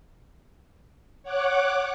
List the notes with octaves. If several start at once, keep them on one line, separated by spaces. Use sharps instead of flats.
C#5 F#5 D6 F#6